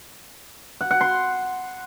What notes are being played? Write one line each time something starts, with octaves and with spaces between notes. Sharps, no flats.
F#5
F#5
C6